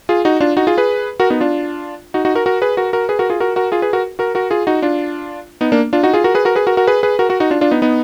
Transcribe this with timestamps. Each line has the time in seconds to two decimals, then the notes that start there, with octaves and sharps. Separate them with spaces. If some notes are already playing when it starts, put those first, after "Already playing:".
0.09 F4 G#4
0.25 D#4 F#4
0.40 D4 F4
0.57 D#4 F#4
0.67 F4 G#4
0.77 G#4 B4
1.20 F#4 A#4
1.30 B3 D#4
1.40 D4 F4
2.14 D#4 F#4
2.25 D#4 F#4
2.35 F#4 A#4
2.46 F#4 A#4
2.62 G#4 B4
2.77 F#4 A#4
2.93 F#4 A#4
3.09 G#4 B4
3.19 F#4 A#4
3.30 F4 G#4
3.40 F#4 A#4
3.56 F#4 A#4
3.72 F4 G#4
3.82 G#4 B4
3.93 F#4 A#4
4.19 F#4 A#4
4.35 F#4 A#4
4.51 F4 G#4
4.67 D#4 F#4
4.82 D4 F4
5.61 B3 D#4
5.72 A#3 D4
5.93 D4 F4
6.03 D#4 F#4
6.14 F4 G#4
6.24 F#4 A#4
6.35 G#4 B4
6.45 F#4 A#4
6.55 G#4 B4
6.67 F#4 A#4
6.77 F#4 A#4
6.87 G#4 B4
7.03 G#4 B4
7.19 F#4 A#4
7.29 F#4 A#4
7.40 D#4 F#4
7.51 D4 F4
7.61 D4 F4
7.71 B3 D#4
7.82 B3 D#4